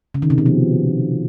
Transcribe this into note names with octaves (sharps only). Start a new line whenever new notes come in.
C#3
D#3
C3
B2
F3